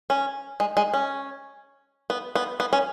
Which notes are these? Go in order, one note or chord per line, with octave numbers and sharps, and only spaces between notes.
C#4
G#3
G#3
C#4
B3
B3
B3
C#4